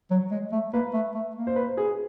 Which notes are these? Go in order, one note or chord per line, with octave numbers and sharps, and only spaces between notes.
F#3
G#3
A3
A#3 B4
A3
A3
A#3
C5
B4
G#4